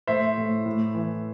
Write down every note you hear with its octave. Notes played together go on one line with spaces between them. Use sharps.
A2 C5 E5
A2
A2
E3